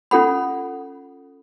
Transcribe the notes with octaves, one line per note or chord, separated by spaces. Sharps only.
C#4 F4 A4 F#5 B5